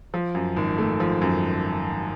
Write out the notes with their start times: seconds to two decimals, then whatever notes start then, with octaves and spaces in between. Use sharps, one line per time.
0.14 F3
0.35 F#2
0.56 G#1
0.78 A3
1.00 F3
1.22 F#2